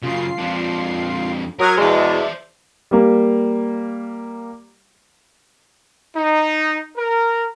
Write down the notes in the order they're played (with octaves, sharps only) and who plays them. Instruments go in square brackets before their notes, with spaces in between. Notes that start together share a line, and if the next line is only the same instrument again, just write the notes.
[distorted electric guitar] F#2 C#3 [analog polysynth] F4 C7
[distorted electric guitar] F2 D4
[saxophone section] F#3 [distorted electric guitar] A#4 [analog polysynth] D#6 F6 G#6
[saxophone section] E2 B2 G#3 [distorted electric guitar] C5 A5 [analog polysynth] D5 E5
[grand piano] G3 A#3
[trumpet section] D#4
A#4